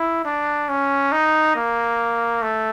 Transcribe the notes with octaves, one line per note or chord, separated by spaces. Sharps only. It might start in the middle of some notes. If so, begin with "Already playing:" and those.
Already playing: E4
D4
C#4
D#4
A#3
A3